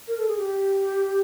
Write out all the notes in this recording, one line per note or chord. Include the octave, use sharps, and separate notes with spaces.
A#4
A4
G#4
G4